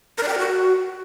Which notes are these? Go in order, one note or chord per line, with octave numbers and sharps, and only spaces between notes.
A#4
D5
G5
A#4
F#4